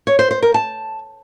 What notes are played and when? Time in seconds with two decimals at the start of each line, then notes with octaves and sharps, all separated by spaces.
0.07 C#5
0.19 C5
0.31 C5
0.42 A#4
0.54 A5